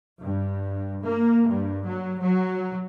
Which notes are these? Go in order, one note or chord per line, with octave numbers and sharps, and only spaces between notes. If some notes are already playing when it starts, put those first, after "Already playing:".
G2
A#3
G2
F#3
F#3